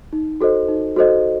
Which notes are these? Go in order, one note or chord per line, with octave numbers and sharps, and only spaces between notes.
D#4
F#4 A4 C5 D#5
D#4
F#4 A4 C5 D#5